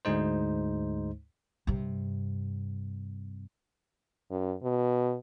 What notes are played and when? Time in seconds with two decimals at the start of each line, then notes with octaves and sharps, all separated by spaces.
0.05 D2 G#2 G#3 D#4 C5
1.67 G2 C3
4.31 F#2
4.63 B2